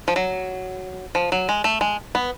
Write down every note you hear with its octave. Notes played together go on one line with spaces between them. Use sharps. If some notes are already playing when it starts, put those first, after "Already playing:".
F3
F#3
F3
F#3
G#3
A3
G#3
B3